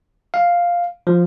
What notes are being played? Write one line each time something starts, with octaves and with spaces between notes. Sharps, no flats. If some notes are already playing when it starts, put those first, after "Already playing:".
F5
F3